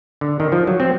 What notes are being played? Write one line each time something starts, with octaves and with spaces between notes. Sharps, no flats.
D3
D#3
F3
F#3
C4